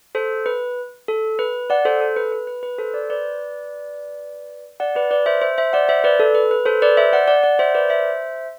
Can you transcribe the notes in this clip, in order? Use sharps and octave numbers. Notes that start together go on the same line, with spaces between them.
A4 C5
B4
A4
B4
D5 F#5
A4 C5
A4
B4
B4
B4
B4
A4 C5
D5
C5
B4 D5
D5 F#5
B4 D5
B4 D5
C5 E5
C5 E5
C5 E5
D5 F#5
C5 E5
B4 D5
A4
B4
B4
A4 C5
B4 D5
C5 E5
D5 F#5
D5 F#5
D5 F#5
C5 E5
B4 D5
C5 E5